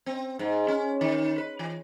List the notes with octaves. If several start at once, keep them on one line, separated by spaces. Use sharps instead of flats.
C4
G#2
C#4
D#3
B4
E3